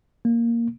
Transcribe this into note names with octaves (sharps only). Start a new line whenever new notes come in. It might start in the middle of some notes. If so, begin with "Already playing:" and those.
A#3